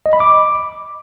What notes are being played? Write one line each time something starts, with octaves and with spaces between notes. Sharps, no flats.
D#5
B5
D6